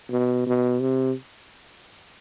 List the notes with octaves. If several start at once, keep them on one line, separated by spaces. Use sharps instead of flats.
B2
B2
C3